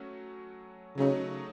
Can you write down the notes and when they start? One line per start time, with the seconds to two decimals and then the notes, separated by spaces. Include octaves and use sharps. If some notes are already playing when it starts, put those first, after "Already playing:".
Already playing: F#3 A3 C#4 F#4
0.97 C#3 F#3 A3 C#4 D#4 F#4